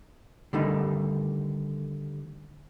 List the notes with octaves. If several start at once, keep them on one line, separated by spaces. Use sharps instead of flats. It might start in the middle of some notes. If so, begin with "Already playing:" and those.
D3 D#3 G3 A3 D#4